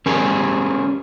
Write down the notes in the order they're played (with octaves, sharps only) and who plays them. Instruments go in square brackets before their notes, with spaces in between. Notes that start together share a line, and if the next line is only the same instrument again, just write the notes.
[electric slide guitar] C#4 G4 G#4 A#4